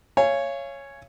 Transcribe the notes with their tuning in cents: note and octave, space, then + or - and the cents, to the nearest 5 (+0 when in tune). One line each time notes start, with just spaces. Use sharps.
C#5 +0 F5 -35 G#5 +0